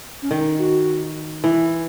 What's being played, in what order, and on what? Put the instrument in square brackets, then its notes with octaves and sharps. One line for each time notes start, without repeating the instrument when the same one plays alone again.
[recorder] C#4
[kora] D#3 [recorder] D#4
[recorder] F#4
[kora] E3